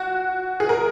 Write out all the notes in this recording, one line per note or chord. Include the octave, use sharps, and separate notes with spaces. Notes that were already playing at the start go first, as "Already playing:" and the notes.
Already playing: F#4
G#4
A#4